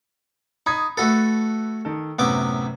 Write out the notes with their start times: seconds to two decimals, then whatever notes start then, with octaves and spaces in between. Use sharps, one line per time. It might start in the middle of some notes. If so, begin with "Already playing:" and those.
0.66 D#4 B5 D#6 G#6
0.97 A3 F#4 A4 B4
1.85 D#3 A4
2.19 F#2 A2 C3 B3 E5 D6